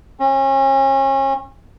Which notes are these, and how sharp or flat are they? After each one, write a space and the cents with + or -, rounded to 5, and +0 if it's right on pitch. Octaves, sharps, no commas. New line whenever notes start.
C#4 -35